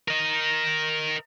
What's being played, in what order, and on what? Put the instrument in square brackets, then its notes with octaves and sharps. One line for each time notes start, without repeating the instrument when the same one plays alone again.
[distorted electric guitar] A#4 D#5